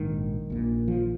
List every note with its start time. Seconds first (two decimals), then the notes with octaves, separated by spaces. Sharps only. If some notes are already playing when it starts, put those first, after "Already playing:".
Already playing: A#1 G#2 D#3
0.50 A#1 A#2
0.88 F3